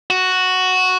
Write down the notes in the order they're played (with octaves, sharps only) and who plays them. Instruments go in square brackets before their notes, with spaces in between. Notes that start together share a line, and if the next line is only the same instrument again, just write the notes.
[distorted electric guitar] F#4